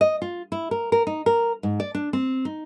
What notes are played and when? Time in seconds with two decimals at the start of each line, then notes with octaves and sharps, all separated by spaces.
0.01 D#5
0.22 F4
0.52 E4
0.71 A#4
0.92 A#4
1.07 D#4
1.26 A#4
1.63 G#2
1.80 D5
1.95 D4
2.13 C4
2.45 D#4